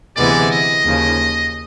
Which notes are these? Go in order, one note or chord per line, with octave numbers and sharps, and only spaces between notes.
D2 C3 E3 G#3 B3 D5
D#5
D#2 C#3 F3